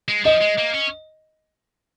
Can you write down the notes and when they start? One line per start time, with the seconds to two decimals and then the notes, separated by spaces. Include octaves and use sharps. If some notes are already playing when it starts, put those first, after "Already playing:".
0.08 G#3
0.24 F3 D#5
0.41 G#3
0.58 A#3
0.74 C#4